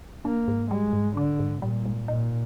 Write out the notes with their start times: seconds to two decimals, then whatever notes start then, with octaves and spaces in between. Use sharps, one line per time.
0.25 A#3 D4
0.47 G#2
0.71 G3 G#3
0.93 G#2
1.17 D3 D4
1.40 G#2
1.62 A#2 G3
1.86 G#2
2.08 A#2 D#4